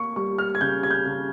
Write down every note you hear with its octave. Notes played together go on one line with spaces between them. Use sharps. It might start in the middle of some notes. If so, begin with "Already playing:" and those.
Already playing: A#3 C#6
G3 C#6
F6
G#6
C#3 G6
G#6
G6
C#3